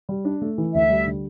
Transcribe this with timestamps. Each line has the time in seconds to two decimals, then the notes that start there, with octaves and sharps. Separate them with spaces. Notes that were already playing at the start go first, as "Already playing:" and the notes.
0.09 G3
0.25 D4
0.41 A3
0.58 E3
0.74 D2 E5
0.90 G3
1.06 D3